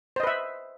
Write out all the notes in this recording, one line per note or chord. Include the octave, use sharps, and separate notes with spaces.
B4 C5 D#5 E5